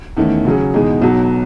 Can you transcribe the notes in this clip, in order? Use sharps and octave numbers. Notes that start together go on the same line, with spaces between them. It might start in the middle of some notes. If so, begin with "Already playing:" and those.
E2 D#3 A3 C#4
C#3 F#3 C#4 G#4
E2 B2 G#3 D#4 G#4
B1 B2 F#3